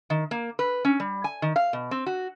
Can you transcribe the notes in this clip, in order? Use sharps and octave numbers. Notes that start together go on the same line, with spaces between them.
D#3
A#3
B4
C#4
G3
G#5
D#3
F5
B2
C4
F#4